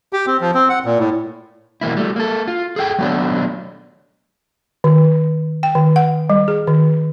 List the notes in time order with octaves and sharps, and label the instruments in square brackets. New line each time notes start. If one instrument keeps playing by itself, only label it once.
[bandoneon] G4
C4
F3
C4
F#5
A#2
A2
[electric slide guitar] B2 E3 A#3 E4
G3 A3
A#3 A4
F4
G#4 A4 E5 G5
F#3 A3 B3 D4 C#5
[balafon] D#3
G5
D#3
F#5
G3
G#4
D#3